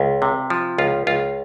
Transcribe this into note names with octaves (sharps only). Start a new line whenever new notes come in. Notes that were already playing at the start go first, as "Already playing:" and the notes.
Already playing: C#2
C3
F3
C#2 F4
C#2 F4